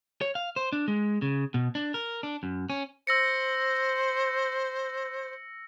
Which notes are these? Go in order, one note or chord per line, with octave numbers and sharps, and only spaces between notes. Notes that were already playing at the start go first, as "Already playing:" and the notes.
C#5
F5
C5
D4
G#3
C#3
B2
D4
A#4
D4
F#2
C#4
C5 E6 A#6 C#7